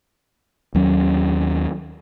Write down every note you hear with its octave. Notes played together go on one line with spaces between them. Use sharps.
D#2 F#3 C#4